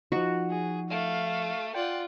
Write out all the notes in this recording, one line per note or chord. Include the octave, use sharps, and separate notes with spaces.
F3 D#4 F#4
G#4
A3 F5
F4 D5 F#5 G5